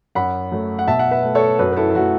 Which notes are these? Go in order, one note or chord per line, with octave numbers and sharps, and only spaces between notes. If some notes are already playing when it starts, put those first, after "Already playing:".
F#2 F#5 B5
F#3 A3
F#5
B2 E5 A5
F#5
B4 E5
A3
A4 C#5
F#2 F#4 B4
B4
E4 A4
A4
F#3 A3 F#4